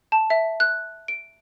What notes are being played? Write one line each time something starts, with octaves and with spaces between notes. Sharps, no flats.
A5
E5
F#6
D7